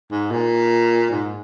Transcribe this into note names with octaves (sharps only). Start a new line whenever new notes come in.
G#2
A#2
G#2